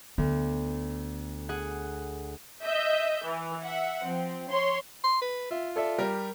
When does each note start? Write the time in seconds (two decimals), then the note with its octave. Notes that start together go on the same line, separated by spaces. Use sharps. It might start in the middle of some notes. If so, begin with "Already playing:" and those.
0.18 D2 B3
1.49 G#4 F#5
2.63 D#5 E5 G6
3.23 E3
3.63 E5 F#5
4.02 F3 C4
4.50 C#5 C6
5.04 C6
5.21 B4
5.51 F4 E5
5.76 A4 D5 E5
5.98 G3 G4 A#4